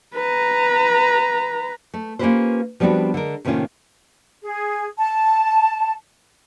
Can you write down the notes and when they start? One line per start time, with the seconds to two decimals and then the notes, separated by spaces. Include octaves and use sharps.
0.16 B4 A#5
1.94 A3
2.19 A#3 C#4 F4 G4 B4 C5
2.80 F3 G3 B3 C4 D4 F#4
3.14 D3 G#3 A#4
3.45 A2 C3 D#3 A#3 C#4 F4
4.44 G#4
4.98 A5